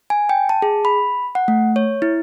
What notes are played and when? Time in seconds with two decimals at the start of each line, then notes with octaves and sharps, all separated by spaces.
0.10 G#5
0.29 G5
0.49 A5
0.62 G#4
0.85 B5
1.35 F#5
1.48 A3
1.76 C#5
2.02 E4